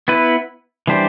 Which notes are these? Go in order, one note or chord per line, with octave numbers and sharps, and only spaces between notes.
B3 E4 B4
E3 G3 D4 G4 C5